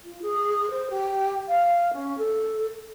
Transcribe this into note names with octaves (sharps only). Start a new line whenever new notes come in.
F4
G#4
C5
G4
F5
C#4
A4